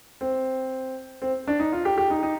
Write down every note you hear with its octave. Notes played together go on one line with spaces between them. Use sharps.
C4
C4
D4
D#4
F4
G4
G4
D#4
D#4